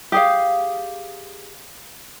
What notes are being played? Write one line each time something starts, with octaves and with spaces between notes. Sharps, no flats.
G4 G#4 F5